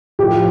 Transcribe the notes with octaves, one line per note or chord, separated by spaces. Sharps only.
A2 F3 G4